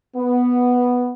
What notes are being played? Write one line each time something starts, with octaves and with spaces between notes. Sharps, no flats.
B3